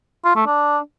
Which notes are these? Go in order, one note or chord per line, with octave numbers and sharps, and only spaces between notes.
F4
A3
D4